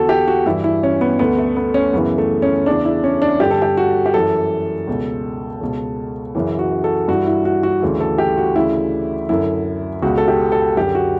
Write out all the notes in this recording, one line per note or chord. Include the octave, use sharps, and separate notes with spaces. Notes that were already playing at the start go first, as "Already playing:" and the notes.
Already playing: E2 D3 F#4 A4
G4
F#4
G2 E3 E4
E4
C#4
B3
D2 D3 B3
A3
B3
C#4
F#2 C#3 E3 B3
A3
C#4
E2 C#3 E3 D4
E4
C#4
D4
G2 D3 G4
A4
G4
F#4
G4
F#2 E3 A4
C#2 B2
C#2 B2
F#2 C#3 E3
F#4
A4
G2 E3 F#4
E4
F#4
F#4
D2 C#3 E3
A4
G4
F#4
D2 C#3 E3 E4
F#2 D3 E4
C#2 B2 F#4
A4
G4
A4
F#2 D3 G4
F#4